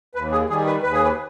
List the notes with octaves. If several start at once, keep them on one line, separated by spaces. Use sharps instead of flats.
D#2 B4
G#4
D#3 G3 G#4
B4
D#2 B4
G#4
B4